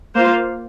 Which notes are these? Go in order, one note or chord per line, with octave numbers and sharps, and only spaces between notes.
A#3 F4 C5 F5